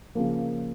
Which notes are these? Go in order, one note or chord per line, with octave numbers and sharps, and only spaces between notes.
C#3 F3 A#3